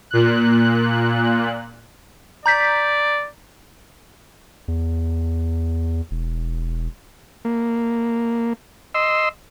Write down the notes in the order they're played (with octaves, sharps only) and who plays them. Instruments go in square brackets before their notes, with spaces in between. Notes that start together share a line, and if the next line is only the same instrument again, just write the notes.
[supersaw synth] A#2 F#6
[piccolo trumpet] D5 [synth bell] A#5 G6 B6
[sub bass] E2
E1
[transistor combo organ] A#3
D#5 C6 E6